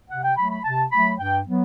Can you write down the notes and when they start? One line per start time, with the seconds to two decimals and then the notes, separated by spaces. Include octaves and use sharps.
0.10 C3 F#5
0.24 G5
0.37 F#3 A3 B5
0.51 B5
0.65 C3 A5
0.92 F#3 A3 B5
1.19 G2 G5
1.47 F#3 B3